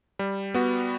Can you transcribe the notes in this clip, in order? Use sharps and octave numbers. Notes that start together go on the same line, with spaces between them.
G3
B3 F#4